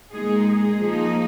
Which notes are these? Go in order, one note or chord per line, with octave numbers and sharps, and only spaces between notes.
A#2 G#3 D#4 G#4
G#4
F3 A#3 D#4